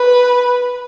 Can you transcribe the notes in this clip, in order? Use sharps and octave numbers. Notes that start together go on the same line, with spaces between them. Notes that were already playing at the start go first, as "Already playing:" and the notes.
Already playing: B4